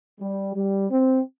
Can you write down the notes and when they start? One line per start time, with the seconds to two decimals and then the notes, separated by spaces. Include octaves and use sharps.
0.20 G3
0.55 G3
0.90 C4